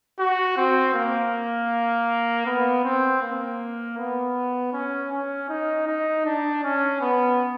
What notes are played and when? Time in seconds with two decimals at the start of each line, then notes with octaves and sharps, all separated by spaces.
0.19 F#4
0.57 C4
0.94 A#3
2.46 B3
2.84 C4
3.22 A#3
3.98 B3
4.73 C#4
5.12 C#4
5.49 D#4
5.87 D#4
6.26 D4
6.63 C#4
7.01 B3